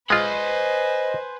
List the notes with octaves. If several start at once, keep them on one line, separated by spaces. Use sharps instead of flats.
G#3 F4 B4 C5 D#5 G#5 B5